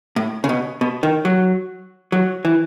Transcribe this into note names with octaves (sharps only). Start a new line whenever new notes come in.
A2
C#3
B2
B2
D#3
F#3
F#3
E3